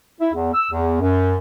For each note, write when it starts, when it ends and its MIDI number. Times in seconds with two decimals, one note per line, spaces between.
0.21 0.29 64
0.34 0.52 40
0.54 0.69 88
0.72 0.97 40
1.01 1.36 42